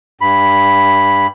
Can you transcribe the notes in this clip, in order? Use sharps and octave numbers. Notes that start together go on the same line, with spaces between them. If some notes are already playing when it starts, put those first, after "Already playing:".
G2 B5